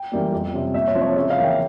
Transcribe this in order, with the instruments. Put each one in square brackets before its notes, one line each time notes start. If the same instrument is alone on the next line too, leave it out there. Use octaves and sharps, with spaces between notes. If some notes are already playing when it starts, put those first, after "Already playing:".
Already playing: [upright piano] G5
E3 G3 A#3
F2
C3 G3 C#4
A#2 E5
C#5
F3 C4
C#5
C#3 E5
C#5 F5
E3 A#3
E5 G5